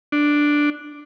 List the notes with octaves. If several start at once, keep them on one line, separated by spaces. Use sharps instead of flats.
D4